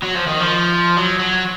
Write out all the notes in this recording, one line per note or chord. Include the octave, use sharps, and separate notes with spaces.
F#3
F3
D#3
F3
F#3
F#3